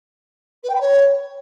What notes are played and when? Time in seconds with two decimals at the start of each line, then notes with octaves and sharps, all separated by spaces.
0.63 B4
0.69 G5
0.75 B5
0.80 C#5